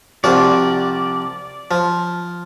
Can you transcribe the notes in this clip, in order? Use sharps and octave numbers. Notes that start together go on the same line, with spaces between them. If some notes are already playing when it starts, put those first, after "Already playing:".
C2 F3 F#4 D5
F3